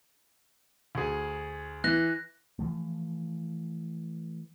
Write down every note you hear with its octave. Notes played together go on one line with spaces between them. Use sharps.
D2 G#4
E3 F#6 A#6
E3 F3 A3